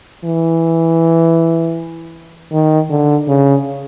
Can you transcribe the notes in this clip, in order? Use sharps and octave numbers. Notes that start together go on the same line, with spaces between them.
E3
D#3
D3
C#3